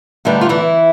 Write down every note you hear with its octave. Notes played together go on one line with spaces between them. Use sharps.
D2 D3 G3 B3 D4 D#4
F4
E3 E4